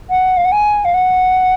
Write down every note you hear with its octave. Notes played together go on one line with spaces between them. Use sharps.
F#5
F5
F#5
G#5
F5
F#5